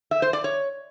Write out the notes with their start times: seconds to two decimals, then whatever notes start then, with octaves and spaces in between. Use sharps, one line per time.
0.11 E5
0.22 C5
0.33 D5
0.44 C#5